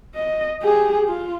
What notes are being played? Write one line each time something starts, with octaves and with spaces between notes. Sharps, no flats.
D#5
G4 G#4
F4